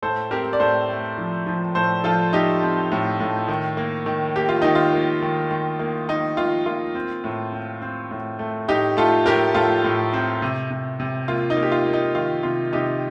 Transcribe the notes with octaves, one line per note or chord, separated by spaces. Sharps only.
A2 A4 C5
C4 G4 A#4
D5
A2 A4 C5
A3
F3
F3
A2 A4 C5
F3 F4 A4
A3 D#4 G4
C4
A2
A2
D#3
A#3
D#3
A#3 G4
F4
D#3 D#4
F4
A#3
D#3
D#3
A#3
A#3 D#4
D#3 F4
A#3 F4
C4
A2
C4
C4
A2
A3
A2 D#4 G4
A3 F4 A4
A2 G4 A#4
A2 F4 A4
A2
C4
C3
C3
C3
A#3 F4
D#4
A#3
G4
F4
A#3
D#4
D#3 F4
C3 F4
C3 D#4 G4